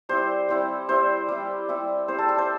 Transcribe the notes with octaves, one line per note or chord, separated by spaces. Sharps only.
G3 C4 E4 C5
G3 C4 E4
G3 C4 E4 C5
G3 C4 E4
G3 C4 E4
G3 C4 E4 C5
A4
A4
C5